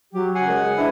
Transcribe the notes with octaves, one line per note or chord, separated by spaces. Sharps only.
F#3 G4
C#3 F#5 G#5 C7
G#3 A#4 C#5
D4 E4 G#4 B4 E5